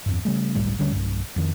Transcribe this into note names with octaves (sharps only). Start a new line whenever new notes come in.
E2 G2
C#3 G3 A3
G1 C#2 A2 G3
D2 D3 G3 C#4
B1 G2
F2 D#3